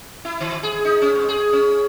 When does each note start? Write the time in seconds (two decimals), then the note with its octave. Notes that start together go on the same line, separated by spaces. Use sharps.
0.25 E4
0.40 D#3
0.63 G#4
0.85 D#4
1.02 C#4
1.15 G#2
1.29 G#4
1.53 C#4